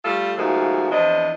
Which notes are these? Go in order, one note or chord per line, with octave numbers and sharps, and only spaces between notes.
G3 A3 F4 A4
D#2 A#2 F3 G#3 A3 F#4
E2 F3 C4 D4 D#5